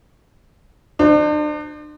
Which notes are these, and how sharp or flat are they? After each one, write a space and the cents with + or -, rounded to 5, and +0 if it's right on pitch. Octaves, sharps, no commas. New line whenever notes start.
D4 +40 C5 +0